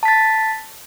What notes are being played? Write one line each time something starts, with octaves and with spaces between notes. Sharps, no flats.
A5 A6 B6